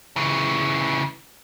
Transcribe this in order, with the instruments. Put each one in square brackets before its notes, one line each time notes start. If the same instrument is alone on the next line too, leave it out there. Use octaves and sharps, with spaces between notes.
[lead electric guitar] C#3 E3